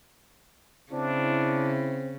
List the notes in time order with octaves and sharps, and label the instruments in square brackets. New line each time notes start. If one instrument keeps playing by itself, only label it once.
[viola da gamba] C#3 [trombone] C4 [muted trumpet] D4 [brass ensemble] E4